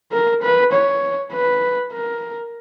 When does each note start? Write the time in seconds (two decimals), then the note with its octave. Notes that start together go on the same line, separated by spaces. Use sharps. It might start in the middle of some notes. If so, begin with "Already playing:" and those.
0.12 A#4
0.42 B4
0.72 C#5
1.33 B4
1.93 A#4